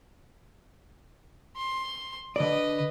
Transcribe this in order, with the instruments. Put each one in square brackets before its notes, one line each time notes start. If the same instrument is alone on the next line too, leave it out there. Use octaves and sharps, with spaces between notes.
[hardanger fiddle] C6
[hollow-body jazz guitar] D3 D5 [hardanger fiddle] B4 D#5